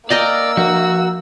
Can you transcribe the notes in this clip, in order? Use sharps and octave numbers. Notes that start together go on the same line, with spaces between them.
A#3 A#4 D5 D#5 G5 E6
F3 F#4